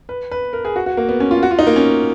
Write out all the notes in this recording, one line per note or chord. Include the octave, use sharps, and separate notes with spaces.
B4
B4
A#4
G#4
F#4
F#4
A#3
B3
C#4
F4
F#4
F4
D#4
A#3
C#4